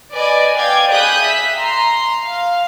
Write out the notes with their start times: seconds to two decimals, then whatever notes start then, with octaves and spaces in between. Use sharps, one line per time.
0.13 B4 D5 D#5 G#5
0.56 D5 F5 G5 G#6
0.91 G#4 B5 D#6 F#6 G6
1.22 E5 B6
1.56 A#5 C6
2.25 F5